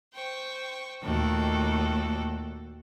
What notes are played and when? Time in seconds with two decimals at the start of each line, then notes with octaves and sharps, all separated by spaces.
0.14 C5 G5 C#6
1.03 D#2 A#2 A3 F#4 A4 G5